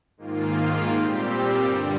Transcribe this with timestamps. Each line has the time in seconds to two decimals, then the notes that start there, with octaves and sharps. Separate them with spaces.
0.17 G#2 D#3 A#3 F4
0.91 A#2 G3 C4 G4
1.63 G2 D3 G3